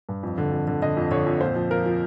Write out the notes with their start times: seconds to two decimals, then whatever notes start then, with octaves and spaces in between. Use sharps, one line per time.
0.09 G2
0.23 F2
0.38 D3
0.52 F2
0.67 D3
0.82 D3 D#5
0.97 F2
1.11 D3 C#5
1.26 F2
1.41 A#2 C5
1.56 F3
1.71 F3 A#4
1.86 F3